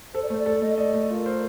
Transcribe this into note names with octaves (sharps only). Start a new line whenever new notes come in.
A4 C5
D5
A3 C5
D5
A4
A3 D#5
D5 D#5
A3
F4 A#4
C5